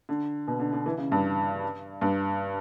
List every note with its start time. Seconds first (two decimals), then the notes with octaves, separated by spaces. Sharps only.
0.09 D3
0.48 B2
0.60 D3
0.73 D3
0.86 E3
0.98 C#3
1.12 G2
2.01 G2